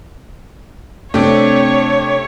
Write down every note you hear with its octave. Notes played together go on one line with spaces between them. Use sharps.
C3 A3 C4 D4 G4 C#5